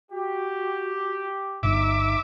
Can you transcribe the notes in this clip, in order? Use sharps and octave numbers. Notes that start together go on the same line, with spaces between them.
F#4 G4
G1 D#4 E5 D6